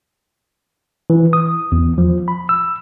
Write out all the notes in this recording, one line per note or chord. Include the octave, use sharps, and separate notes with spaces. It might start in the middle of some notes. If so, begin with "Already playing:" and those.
E3
D#6
E2
F3
B5
E6